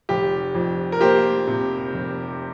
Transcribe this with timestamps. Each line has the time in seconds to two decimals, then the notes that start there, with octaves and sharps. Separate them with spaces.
0.09 F1 G4
0.55 F2
0.92 A#4
1.01 A#3 G4 C5
1.47 C3
1.93 F1